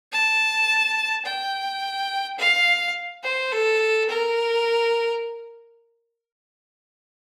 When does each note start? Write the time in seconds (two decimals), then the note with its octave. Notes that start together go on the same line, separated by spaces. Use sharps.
0.12 A5
1.25 G5
2.39 F5
3.24 C5
3.52 A4
4.09 A#4